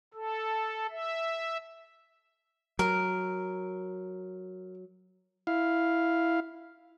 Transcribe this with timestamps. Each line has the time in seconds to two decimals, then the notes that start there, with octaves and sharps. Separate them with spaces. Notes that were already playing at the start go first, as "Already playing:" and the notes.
0.14 A4
0.90 E5
2.79 F#3 A#4
5.47 E4 F5